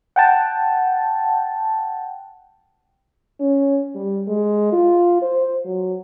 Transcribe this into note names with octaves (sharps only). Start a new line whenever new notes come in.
F#5 G5 A5
C#4
G3
G#3
F4
C5
F#3